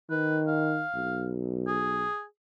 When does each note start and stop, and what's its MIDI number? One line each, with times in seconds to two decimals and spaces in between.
0.10 0.83 51
0.10 0.40 71
0.47 1.29 77
0.95 2.05 35
1.67 2.24 68